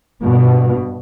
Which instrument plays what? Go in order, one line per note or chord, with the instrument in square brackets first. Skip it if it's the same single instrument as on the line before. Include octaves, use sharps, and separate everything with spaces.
[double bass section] G2 B2